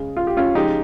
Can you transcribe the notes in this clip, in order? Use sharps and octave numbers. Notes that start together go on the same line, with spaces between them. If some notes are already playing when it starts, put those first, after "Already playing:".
Already playing: C#3 G#3
F4
G4
C#4 F4
C#3 F3 G#3 D#4 G4